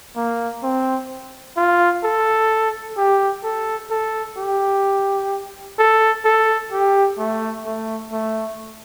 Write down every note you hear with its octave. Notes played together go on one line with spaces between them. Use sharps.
A#3
C4
F4
A4
G4
A4
A4
G4
A4
A4
G4
A3
A3
A3